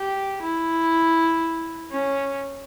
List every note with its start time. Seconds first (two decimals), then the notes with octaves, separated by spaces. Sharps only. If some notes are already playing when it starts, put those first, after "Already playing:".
Already playing: G4
0.42 E4
1.91 C#4